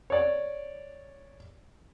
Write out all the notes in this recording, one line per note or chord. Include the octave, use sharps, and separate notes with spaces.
C#5 D5